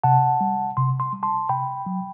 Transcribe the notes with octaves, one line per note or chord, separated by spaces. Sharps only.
C3 F#5 A5
G3
C3 C6
C6
G3
A5 C6
C3 G5 B5
F#3